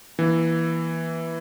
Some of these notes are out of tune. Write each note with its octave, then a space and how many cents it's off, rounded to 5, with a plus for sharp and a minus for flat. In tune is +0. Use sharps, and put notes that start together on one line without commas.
E3 +0 A#3 +30